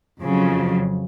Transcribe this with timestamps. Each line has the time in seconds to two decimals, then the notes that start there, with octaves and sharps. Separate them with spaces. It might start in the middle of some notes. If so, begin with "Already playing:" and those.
0.21 F2 C#3 F#3